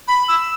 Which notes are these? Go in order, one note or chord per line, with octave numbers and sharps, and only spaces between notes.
B5
E6